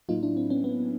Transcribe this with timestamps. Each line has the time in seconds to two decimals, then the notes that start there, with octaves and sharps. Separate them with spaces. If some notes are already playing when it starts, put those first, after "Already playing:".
0.09 A2 F#3 A#3 D#4 F4
0.23 D4 E4
0.37 C4
0.50 B3 C#4
0.64 B3